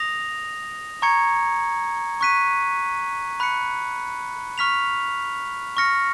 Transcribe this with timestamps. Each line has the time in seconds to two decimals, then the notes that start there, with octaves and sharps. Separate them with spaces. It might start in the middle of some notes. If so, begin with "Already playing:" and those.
Already playing: D#6 A#6 F7
1.02 A#5 C#6 G#6 C#7
2.21 C#6 F#6 B6 D#7
3.40 B5 F#6 C#7
4.58 C#6 F6 B6 F7
5.77 C#6 F6 A#6 C#7